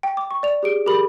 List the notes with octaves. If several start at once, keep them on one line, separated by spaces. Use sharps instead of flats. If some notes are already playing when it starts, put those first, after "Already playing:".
G5
D6
C#6
D5 F7
G4 G#4 D7
G4 G#4 A#4 B5 F#7